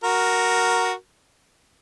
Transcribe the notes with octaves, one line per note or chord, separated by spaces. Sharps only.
F#4 A#4